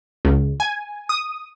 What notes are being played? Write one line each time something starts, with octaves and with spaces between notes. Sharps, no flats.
C#2
G#5
D#6